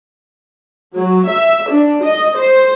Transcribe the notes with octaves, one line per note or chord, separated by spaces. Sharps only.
F#3
E5
D4
D#5
C5